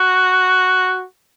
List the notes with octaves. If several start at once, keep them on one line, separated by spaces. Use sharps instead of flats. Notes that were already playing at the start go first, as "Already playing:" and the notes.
Already playing: F#4